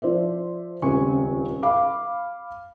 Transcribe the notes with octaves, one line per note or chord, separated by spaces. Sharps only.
F3 C5 D5 E5
D#1 C#2 C4 G#5 C#6
F5 B5 D6